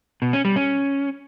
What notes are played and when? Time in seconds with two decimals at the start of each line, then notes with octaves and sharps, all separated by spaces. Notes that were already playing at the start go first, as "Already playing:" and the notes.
0.22 B2
0.33 C#4
0.45 G3
0.56 C#4